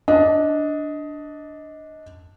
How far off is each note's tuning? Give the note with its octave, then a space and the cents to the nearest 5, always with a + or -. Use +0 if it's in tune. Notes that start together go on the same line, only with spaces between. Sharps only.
D4 +0 D#5 +15